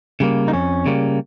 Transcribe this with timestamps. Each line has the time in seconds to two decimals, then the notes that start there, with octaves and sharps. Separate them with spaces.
0.20 C#3 G3 A#3
0.48 D#4
0.53 F2 C#4
0.86 C#3 G3 A#3